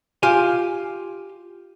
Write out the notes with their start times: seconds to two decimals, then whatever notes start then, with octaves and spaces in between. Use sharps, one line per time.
0.23 F4 G4 G#5